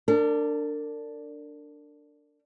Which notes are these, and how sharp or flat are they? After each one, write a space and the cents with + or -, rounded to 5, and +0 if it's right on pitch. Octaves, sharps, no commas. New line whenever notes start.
D4 +0 A#4 -40